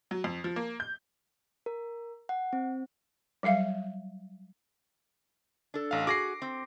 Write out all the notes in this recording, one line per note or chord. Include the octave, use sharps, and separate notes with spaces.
F#3
F2
F3
A#3
G6
A#4
F#5
C4
F#3 G3 E5 F5
D4 A4
A1 F5
F#4 G#4 D6 A#6 C7
C4